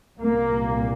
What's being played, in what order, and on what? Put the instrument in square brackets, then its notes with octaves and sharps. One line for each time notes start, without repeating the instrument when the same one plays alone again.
[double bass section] C2 A#2 A#3